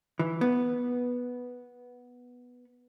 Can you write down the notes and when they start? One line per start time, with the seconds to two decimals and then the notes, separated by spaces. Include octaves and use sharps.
0.19 E3
0.41 B3